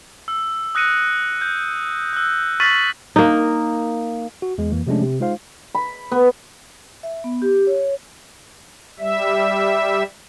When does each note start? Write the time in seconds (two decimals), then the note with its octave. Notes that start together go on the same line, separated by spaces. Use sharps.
0.28 E6
0.75 D#6 F#6 A#6 C#7 D#7
1.41 G6
2.13 E6 F#6
2.60 C#6 F6 A6 B6 D#7 F#7
3.16 A#3 D#4
4.42 F#4
4.58 E2 G#3
4.71 F2 E3 A#3
4.87 C3 F3 G#3 A3 C#4 D4
5.02 C3
5.20 G#3 D#4 F4 C5 F5
5.75 B5
6.12 B3
7.03 E5
7.24 B3
7.42 G4
7.67 C#5
8.99 G3 E5